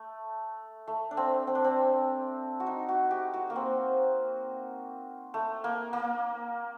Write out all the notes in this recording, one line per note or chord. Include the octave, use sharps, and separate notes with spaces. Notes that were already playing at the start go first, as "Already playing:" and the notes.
Already playing: A3
A3
D4
C4
C4
D4
C4
F#4
D#4
F#4
G4
F#4
A#3
C4
A3
A#3
A#3